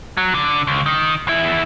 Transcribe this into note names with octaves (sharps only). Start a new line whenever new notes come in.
F#3
D3
C#2
D#3
E2 E4